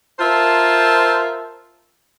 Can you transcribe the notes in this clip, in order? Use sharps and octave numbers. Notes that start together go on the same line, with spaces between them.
F4 A#4 C5 E5 A5